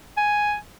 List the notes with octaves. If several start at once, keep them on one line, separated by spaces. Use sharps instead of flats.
G#5